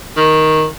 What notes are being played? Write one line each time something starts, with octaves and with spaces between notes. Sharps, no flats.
D#3